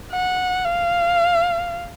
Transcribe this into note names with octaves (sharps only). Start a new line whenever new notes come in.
F#5
F5